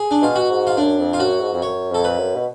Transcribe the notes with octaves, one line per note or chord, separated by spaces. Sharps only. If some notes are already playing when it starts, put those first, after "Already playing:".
Already playing: G#4
D4
B2 F4
F#4
G#2
F4
F#2 D4
F2
F4
F#2 F#4
G#2
F2
F#2 C#5
F2 A4
B4
F#2
B2